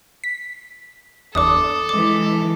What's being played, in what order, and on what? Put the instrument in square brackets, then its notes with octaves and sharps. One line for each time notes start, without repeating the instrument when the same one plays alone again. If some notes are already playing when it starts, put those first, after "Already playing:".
[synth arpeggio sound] B6
[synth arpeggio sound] G1 E2 D4 [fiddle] A4 [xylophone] D6 D#6
[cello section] E3 G#3 [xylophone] D6